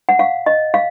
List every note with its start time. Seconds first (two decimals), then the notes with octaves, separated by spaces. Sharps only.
0.09 F#5
0.19 F5
0.46 D#5
0.74 F5